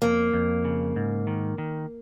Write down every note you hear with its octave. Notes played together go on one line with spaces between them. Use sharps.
F2 A#3
F2
C#3
G#2
D#3
D#3